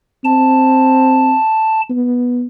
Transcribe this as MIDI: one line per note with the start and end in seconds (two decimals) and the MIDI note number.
0.25 1.35 60
0.25 1.81 81
1.90 2.47 59